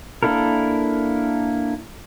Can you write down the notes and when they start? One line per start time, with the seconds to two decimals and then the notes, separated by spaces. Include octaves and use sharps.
0.23 A#3 D4 E4 A4 A#4